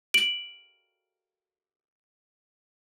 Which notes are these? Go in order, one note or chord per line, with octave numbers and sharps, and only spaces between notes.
D7 F#7